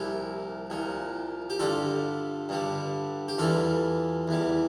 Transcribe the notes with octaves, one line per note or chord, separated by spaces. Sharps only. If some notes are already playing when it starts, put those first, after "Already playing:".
Already playing: C2 A#2 F3 E4 G4
C2 A#2 F3
G4
G2 D3 G3 F4 A4
G2 D3 G3
G4
E2 E3 G3 F4 A4
E2 E3 G3